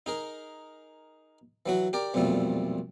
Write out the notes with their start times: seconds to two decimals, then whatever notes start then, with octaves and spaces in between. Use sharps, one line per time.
0.06 D#4 G#4 A#4
1.66 E3 F#3 F#4
1.93 G4 A#4 D5
2.14 B1 F2 A#2 G3 A3